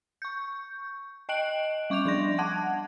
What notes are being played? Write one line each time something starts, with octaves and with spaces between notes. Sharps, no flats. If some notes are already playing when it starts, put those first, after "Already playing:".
C#6 G6
D#5 G5 F#6 D7 F#7
G3 C#6 D6 G6 F7
F3 D4 C6 A#6
F#5 A5 D6 F#6 G#6